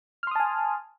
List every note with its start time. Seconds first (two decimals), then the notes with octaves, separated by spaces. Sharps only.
0.23 F6
0.27 C6
0.31 D#6
0.36 A5
0.40 G#5